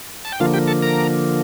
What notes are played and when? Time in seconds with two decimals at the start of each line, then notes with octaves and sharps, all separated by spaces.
0.25 A5
0.32 G5
0.40 D3 F3 A#3 F4 F5
0.54 G4 G5
0.68 A4 A5
0.82 A#4 A#5